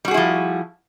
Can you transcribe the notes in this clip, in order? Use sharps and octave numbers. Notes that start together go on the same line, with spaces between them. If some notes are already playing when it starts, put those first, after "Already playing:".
F3 G3 E4 F#4 G#4